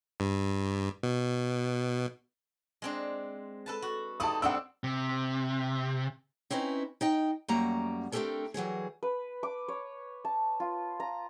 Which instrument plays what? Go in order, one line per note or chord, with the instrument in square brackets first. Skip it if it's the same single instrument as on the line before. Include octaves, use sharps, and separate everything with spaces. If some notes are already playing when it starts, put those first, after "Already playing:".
[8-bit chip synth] G2
B2
[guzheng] G#3 C4 D4
A4 B4 A5
F#4
[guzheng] D#4 E4 G4 [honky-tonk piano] A5 D#6
[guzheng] G3 C4 D4 [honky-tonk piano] F#5 E6
[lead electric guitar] C3
[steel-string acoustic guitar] C4 C#4 D#4 E4 B4
D#4 D#5 G5
F#2 G3 A3 A#3 F#5 A#5
A3 C4 D4 G4 A4 A#4
E3 F#3 G3 G#4
[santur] B4
D6
C#5
A5
F4
A#5